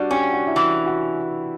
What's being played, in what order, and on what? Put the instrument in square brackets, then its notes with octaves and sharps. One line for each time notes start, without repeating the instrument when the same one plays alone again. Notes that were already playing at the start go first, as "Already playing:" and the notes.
Already playing: [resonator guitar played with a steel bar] G3 [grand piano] D4 F#4
[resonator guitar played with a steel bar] C#4 [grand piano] G4
[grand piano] F#4
E4
[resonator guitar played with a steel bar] E3 [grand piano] F#4
[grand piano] F#4